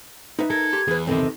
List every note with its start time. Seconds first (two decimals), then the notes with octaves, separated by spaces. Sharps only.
0.39 D#4 B4 E5
0.50 A4 A#4 G#6
0.73 G4 C6
0.88 E2 G#4 B4
1.07 C#2 C3 D#3 C4 A4